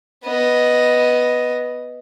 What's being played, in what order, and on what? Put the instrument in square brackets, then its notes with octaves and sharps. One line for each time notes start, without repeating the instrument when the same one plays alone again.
[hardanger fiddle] B3 D#5